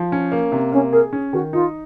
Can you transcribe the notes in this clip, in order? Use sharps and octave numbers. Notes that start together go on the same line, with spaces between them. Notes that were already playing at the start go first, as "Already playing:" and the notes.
Already playing: F3
C#4
A#3
C3
A#3 C#4
G#4 A#4
C#4
D#3 F#4
D#4 F4